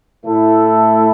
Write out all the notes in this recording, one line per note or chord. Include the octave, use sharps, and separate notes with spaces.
A2 A3 E4 A4